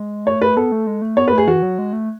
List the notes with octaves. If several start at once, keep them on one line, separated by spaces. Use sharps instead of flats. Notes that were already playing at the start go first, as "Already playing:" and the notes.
Already playing: G#3
A3 C#5
B4
B3 A4
A3
G#3
A3
B3 C#5
B4
A3
G#4
E3 F#4
F#3
G#3
A3